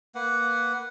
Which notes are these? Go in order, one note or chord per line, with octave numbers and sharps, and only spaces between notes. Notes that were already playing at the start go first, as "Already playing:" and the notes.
A#3 B4 F#5